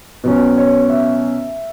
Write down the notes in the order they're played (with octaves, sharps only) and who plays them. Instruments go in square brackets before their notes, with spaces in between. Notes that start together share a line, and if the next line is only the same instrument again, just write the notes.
[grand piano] B2 F#3 C#4
C#5
E5